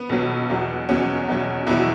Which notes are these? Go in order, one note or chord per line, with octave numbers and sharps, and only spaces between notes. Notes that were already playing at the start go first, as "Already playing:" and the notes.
Already playing: B3
B1 B2 F#3
E2 B2 F#3
E2 B2 F#3 C#4
E2 B2 F#3
E2 B2 F#3 E4